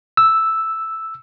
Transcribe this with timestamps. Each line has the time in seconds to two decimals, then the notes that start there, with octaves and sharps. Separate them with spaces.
0.17 E6